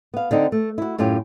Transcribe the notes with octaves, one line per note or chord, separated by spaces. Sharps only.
B3 F5
D3 C4 D#4
A3
E4 F#4
F#2 A2 C#4 F4 G4